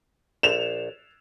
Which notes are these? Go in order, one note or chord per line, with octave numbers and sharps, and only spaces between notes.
A#1 E7 F7